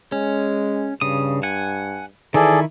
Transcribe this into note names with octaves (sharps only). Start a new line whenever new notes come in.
G#3 C#4
G2 C#3 D#6
F#5 G#5
D#3 E3 E4 G#4 A4 D5